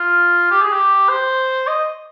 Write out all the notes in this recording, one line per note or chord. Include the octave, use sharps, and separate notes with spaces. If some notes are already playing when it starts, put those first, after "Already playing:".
Already playing: F4
G4
G#4
G4
C5
D#5